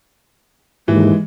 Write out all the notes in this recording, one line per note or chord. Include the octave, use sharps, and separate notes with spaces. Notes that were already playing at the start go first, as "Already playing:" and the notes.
D#2 G#2 E3 G#3